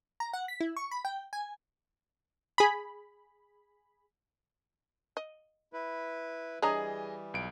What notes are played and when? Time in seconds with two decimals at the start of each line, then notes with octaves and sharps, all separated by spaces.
0.20 A#5
0.33 F#5
0.48 B6
0.60 E4
0.76 C#6
0.91 B5
1.05 G5
1.33 G#5
2.58 G#4 B5
5.17 D#5
5.73 E4 B4
6.62 E3 G3 D4 G#4 C#5 D#5 A#5 D#6
7.34 B1 D7